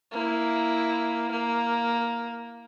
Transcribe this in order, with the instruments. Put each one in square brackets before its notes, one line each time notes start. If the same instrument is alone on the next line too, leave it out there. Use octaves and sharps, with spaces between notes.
[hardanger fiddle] A#3 E4
A#3